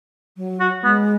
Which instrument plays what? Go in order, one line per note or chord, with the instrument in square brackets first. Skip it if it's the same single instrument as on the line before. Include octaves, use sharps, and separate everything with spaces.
[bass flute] F#3
[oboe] F#4
[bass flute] G#3 [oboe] B3